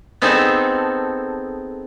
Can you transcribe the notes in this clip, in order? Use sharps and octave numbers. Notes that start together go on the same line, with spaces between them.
B3 C4 D#4 G#4 A4